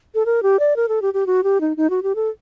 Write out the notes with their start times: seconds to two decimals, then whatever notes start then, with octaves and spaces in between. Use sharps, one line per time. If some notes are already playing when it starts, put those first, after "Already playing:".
0.15 A4
0.26 A#4
0.43 G4
0.59 D5
0.76 A#4
0.89 A4
1.02 G4
1.14 G4
1.27 F#4
1.44 G4
1.61 D#4
1.77 D#4
1.90 F#4
2.03 G4
2.16 A4